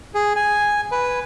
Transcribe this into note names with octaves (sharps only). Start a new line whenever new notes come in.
G#4
G#5
B4